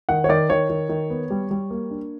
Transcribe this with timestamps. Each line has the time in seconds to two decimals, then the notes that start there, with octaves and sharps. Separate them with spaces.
0.09 D#3 F#5
0.24 C#5
0.29 D#3 D5
0.50 D#3 C#5
0.70 D#3
0.89 D#3
1.10 B3
1.30 G3
1.51 G3
1.70 A#3
1.91 D4